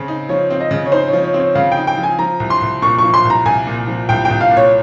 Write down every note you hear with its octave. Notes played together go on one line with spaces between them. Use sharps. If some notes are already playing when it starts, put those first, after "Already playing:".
Already playing: C#3 C4
D#4
F3 C#5
C4
D#5
C#3
C#5
D#4 C5
C#5
F3
C#5
C4
C#5
C#3 F5
G5
D#4
G5
F3
G#5
F3 A#5
C2
C6
C2
A#2 C#6
C#6
F3
C6
C2
A#5
C2 G#5
A#2
F3
C2 G5
G5
C2
F5
A#2
C#5